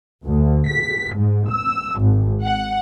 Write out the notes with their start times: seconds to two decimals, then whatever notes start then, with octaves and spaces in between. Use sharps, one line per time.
0.24 D2
0.67 B6
1.13 G#2
1.49 E6
1.99 G#1
2.43 F#5